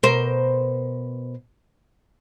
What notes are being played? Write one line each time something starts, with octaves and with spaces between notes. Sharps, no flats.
B2 A#4 C5